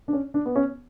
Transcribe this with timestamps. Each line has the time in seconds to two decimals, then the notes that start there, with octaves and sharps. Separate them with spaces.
0.08 D4
0.13 C#4
0.34 D4
0.46 B3
0.56 C#4